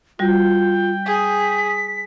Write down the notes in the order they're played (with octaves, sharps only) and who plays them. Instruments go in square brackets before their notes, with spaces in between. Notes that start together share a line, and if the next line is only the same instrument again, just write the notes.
[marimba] G3 F#4 [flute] F4 [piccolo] G5
[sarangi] G#4 [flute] B6